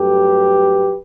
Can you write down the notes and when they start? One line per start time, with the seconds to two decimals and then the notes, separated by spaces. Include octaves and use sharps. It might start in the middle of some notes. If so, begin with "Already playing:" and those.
Already playing: G2 F#3 A3 G4 B4